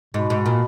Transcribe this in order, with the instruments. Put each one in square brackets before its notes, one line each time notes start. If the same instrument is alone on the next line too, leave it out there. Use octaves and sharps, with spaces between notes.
[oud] G#2 [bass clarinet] B2
[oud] G#2
A#2